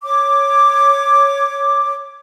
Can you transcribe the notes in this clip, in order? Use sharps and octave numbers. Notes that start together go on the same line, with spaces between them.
C#5 D6